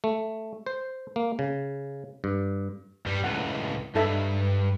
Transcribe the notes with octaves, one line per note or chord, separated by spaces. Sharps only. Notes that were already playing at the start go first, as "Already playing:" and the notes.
A3
C5
A#3
C#3
G2
G2 G3
C#2 A2 F#5
G2 D#4 A4 E5